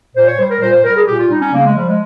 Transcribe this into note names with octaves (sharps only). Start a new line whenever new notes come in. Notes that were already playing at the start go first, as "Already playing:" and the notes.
A#2 C5
C#5
G3 C5
A#4
A#2 C5
C5
G3 A#4
G#4
A#2 G4
F4
G3 D#4
C#4
C#3 A#3
G#3
F3 G3
G#3